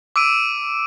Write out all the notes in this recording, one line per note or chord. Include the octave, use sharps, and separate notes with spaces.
D6 E6 D7 D#7